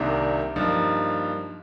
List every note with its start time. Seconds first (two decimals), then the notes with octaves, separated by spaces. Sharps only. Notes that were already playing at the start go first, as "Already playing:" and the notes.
Already playing: C2 C3 D#3 A#3 D4
0.56 G2 F3 A#3 D#4